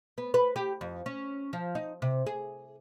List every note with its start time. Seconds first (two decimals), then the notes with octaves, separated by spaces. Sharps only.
0.18 B3
0.34 B4
0.56 G4
0.81 F2
1.06 C#4
1.53 F3
1.75 D#4
2.02 C3
2.27 G#4